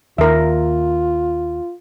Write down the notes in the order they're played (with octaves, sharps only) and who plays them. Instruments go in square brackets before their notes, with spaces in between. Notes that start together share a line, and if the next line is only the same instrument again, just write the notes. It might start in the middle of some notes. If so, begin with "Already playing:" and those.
[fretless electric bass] D#2 [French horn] F4 [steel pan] A#4 E5